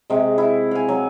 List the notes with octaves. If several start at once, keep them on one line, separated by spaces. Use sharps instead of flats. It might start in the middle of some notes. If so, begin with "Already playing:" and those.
C3 G#3
E4
F5 G#5
F#3